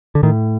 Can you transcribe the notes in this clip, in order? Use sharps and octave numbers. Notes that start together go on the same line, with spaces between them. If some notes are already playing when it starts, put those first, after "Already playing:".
D3
A2 D#3